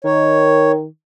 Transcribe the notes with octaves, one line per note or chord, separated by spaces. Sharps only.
D#3 C#5